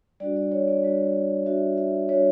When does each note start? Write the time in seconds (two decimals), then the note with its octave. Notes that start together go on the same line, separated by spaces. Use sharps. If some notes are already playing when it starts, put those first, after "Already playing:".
0.20 G3 D4 F#4 D5
0.36 D5
0.52 C#5
0.67 D5
0.83 G3 D4 F#4
1.46 G3 D4 F#4 E5
1.77 E5
2.09 G3 D4 F#4 C#5